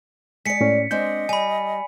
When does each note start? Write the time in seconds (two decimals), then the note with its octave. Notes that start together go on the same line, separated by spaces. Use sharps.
0.46 G#3 D5 B6 C#7
0.61 A2 C#4
0.91 G#3 C4 D4 D#5 G6
1.29 G3 G#5 B5